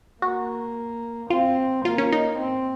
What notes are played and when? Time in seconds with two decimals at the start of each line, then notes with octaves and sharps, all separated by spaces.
0.22 A#3 F#4
1.30 C4 F4
1.85 A#3 F4
1.98 C#4
2.12 D#4
2.39 C4